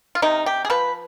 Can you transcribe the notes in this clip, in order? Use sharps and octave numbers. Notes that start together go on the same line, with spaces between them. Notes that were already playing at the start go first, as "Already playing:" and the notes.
F4
C3 D#4
G4
G#4
F3 B4